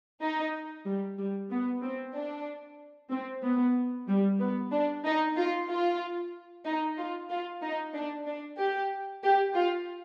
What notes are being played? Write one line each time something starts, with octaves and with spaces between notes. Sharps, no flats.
D#4
G3
G3
B3
C4
D4
C4
B3
G3
B3
D4
D#4
F4
F4
D#4
F4
F4
D#4
D4
D4
G4
G4
F4